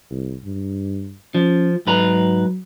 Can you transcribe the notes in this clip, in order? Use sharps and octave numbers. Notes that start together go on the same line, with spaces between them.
C2
G2
F3 C#4
G#2 F#3 B4 A#5